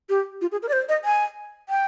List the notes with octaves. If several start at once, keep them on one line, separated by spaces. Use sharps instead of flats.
G4
F4
G#4
A#4
D5
C5
D#5
G#5
G5